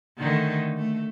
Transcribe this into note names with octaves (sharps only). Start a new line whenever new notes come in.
D3 D#3 A3
A3